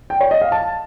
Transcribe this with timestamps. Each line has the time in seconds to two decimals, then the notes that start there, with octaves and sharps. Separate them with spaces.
0.10 G5
0.21 C#5
0.31 D#5
0.42 F5
0.52 A5